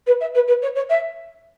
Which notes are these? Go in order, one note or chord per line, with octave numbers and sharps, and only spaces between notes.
B4
E5
B4
B4
C#5
C#5
E5